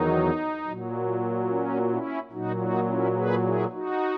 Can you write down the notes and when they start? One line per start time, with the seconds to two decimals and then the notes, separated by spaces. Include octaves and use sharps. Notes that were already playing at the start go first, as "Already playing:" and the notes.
Already playing: E2 D#3 F#3 D#4
0.64 A#2 F#3
1.48 C#4
1.89 C#4 E4
2.31 A#2 F#3 D#4 F#4
2.60 D#4 F#4
2.87 C#4 E4
3.15 G#4 B4
3.44 E4 G#4
3.71 D#4 F#4